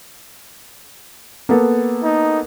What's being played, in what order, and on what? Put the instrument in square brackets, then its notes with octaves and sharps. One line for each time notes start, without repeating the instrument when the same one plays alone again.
[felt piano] A#3 B3 A4
[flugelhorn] D#4